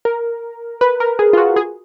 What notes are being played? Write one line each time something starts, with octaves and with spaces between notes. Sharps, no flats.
A#4
B4
A#4
G#4
F4
F#4
G#4